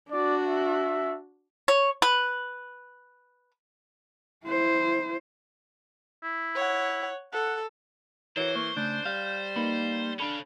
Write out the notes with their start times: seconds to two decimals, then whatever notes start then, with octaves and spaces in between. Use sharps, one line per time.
0.11 D4 F#4 D5
0.47 E5
1.68 C#5
2.02 B4
4.46 E4 C5
6.23 E4
6.55 C#5 F#5
7.33 A4 F#5
8.37 E3 F#4 A#4 C5 C#5
8.56 A#3 C#6
8.77 C#3 A3 C#4 D4 G6
9.06 G3 F5
9.56 A#3 D#4 B4
10.20 C#4 D4 A4 F5 B5